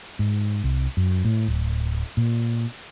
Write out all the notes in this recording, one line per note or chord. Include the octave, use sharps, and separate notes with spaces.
G#2
C2
F#2
A2
D1
A#2